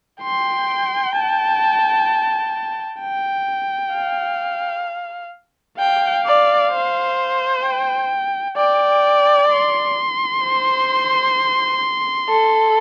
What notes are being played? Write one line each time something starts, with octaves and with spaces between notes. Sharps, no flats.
G5 C6
A5
G5
F5
F5 G5
D5
C5
G5
D5 G5
C6
C5
A4